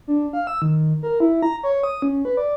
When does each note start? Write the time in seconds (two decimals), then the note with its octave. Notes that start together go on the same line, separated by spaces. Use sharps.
0.08 D4
0.33 F5
0.47 E6
0.62 D#3
1.03 A#4
1.20 E4
1.42 A#5
1.63 C#5
1.83 D#6
2.02 C#4
2.25 B4
2.37 D5